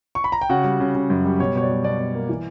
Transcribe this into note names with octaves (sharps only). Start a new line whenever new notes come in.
C#6
B5
A#5
G5
C#3 F#4 F#5
G3
C#3
C#3
F#2
G3
B2 C#5
B2 C#5
D5
G3
B2 D5
B2
A#3
E3